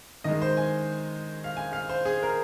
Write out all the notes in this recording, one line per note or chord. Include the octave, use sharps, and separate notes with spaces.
D#3 G#3 D#5
C5
G#5
F5
G#5
F5
C5
G#4
A#4